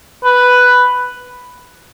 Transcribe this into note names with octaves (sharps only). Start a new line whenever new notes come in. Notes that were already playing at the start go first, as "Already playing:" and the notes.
B4